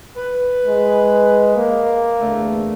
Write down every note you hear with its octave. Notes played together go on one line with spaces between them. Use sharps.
B4
G#3
A#3
E2 D3 A3